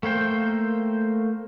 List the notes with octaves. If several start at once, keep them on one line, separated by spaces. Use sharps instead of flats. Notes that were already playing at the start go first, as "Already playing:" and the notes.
A3 A#3 C5 G5